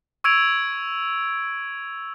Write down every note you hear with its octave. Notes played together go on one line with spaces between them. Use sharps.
C#6 E6 G#6 D7 F7